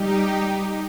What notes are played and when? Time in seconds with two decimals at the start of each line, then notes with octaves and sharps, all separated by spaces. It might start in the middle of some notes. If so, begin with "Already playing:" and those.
Already playing: G3 D#4 G4